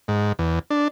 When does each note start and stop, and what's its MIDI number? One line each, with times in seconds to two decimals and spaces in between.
0.08 0.33 44
0.39 0.59 40
0.70 0.88 62